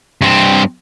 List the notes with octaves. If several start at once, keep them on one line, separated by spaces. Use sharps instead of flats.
G2 C4